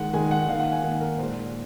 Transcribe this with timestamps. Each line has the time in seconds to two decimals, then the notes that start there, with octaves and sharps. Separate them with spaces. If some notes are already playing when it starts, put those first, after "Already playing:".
Already playing: D#3 G#3 F#5
0.13 D#3 G#3 G#5
0.31 F#5
0.48 D#3 F5
0.53 A#3
0.60 F#5
0.72 G#5
0.84 D#3 A#3
1.01 A#4
1.18 A#2 G#3 C5